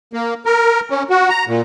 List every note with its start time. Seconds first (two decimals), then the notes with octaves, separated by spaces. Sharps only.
0.13 A#3
0.46 A#4
0.90 C#4
1.10 F#4
1.29 A#5
1.48 A#2